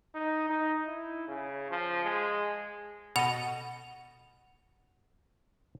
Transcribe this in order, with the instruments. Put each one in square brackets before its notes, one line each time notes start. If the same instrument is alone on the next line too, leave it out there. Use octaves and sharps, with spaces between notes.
[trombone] D#4
D#4
E4
C#3
F3
G#3
[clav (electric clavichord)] B2 A4 D#5 [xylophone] F#5 F7